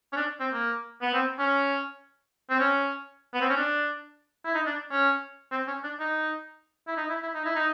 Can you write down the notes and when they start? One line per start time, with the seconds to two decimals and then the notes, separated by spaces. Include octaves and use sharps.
0.13 C#4
0.16 D4
0.40 C4
0.53 A#3
1.02 B3
1.14 C4
1.39 C#4
2.50 C4
2.60 C#4
3.34 B3
3.42 C4
3.49 C#4
3.57 D4
4.45 E4
4.55 D#4
4.66 D4
4.91 C#4
5.52 C4
5.67 C#4
5.84 D4
6.00 D#4
6.88 E4
6.97 D#4
7.09 E4
7.22 E4
7.34 D#4
7.45 E4
7.56 D#4